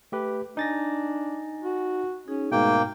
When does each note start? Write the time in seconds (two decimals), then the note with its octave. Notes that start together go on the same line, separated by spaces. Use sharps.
0.12 A3 G4 B4
0.57 D4 D#4 G#5 A6 A#6
1.64 F#4
2.28 C#4 D#4 G#4
2.52 G#2 B2 A3 A#3 G5